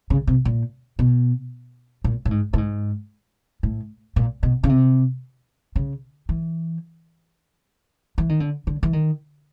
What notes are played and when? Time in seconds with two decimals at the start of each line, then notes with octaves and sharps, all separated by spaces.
0.10 C#3
0.27 C3
0.45 A#2
0.99 B2
2.04 A#2
2.25 A2
2.31 G#2
2.53 A2
2.58 G#2
3.63 A2
4.16 A#2
4.43 B2
4.64 C#3
4.69 C3
5.76 C#3
6.29 E3
8.18 E3
8.29 D#3
8.40 D3
8.67 D3
8.83 E3
8.93 D#3